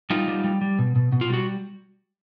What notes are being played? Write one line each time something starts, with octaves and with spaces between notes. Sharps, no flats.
G3 D#4 F4
G3
G3
G3
B2
B2
B2
F4
G3 F#4